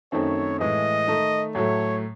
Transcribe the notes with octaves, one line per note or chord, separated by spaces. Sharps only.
F#2 D#3 A3 C4 D#4 C#5
A2 E3 G#3 D#5
D#3 A3 D#4
A2 F#3 A3 C#5